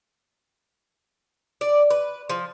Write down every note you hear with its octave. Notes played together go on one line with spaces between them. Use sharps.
D5
B4
F3